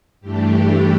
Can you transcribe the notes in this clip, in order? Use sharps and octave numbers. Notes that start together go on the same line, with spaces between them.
G2 E3 A3 D4 G4